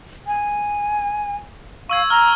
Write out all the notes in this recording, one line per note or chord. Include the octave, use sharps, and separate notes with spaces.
G#5
F5 C#6 E6 G#6
A#5 F6